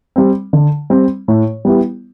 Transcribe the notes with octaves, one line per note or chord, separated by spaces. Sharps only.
G3 C4
D3
G3 C4
A2
G3 B3 E4 G4